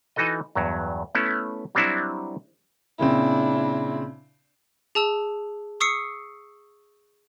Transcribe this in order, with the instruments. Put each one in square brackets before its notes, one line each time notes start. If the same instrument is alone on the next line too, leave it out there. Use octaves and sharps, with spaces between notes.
[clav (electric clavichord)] E3 D#4 F#4 A4 D#5
E2 G2 F#3
A3 B3 C#4 E4
F#3 G3 C4 D4 E4 F#4
[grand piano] A#2 C#3 C4 [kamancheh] D4 E4
[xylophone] G#4 A5 E6 F7
C#6 D#6 E6 C7 C#7